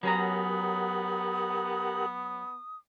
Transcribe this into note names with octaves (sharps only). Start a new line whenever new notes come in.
F#3 B3 C#4 G4 A#4 F#5 A#5 D#6